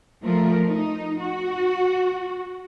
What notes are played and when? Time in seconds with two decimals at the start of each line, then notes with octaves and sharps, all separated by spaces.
0.22 F3 A3 A#4
0.67 D#4
1.20 F#4